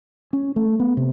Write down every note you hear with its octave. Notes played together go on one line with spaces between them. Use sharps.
C#4
A3
B3
C3